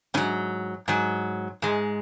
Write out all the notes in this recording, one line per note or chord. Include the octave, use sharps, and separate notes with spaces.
G#2 F#3 C#4
G#2 F#3
G#2 G#3